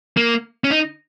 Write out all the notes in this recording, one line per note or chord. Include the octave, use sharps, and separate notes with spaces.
A#3
C#4
D#4